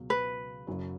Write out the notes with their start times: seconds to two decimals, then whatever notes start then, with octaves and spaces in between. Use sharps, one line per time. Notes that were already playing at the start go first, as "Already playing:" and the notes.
Already playing: C#2 B2 F#3
0.10 B4
0.67 F#1 F#2 F#3